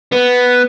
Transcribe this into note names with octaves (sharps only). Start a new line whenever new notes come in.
B3